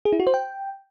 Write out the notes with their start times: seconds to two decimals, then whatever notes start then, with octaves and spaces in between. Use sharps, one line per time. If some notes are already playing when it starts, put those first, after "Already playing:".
0.05 G#4
0.13 E4
0.20 F#4
0.27 C5
0.34 G5